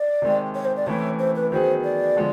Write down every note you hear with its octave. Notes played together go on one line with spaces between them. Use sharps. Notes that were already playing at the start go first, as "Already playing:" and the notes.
Already playing: D5
C3 D#3 G#3
C#5
C5
D5
C3 E3 A3 C#4 E4 C#5
C5
B4
D#3 F#3 B3 D#4 G#4 C5
D5
D3 F3 G#3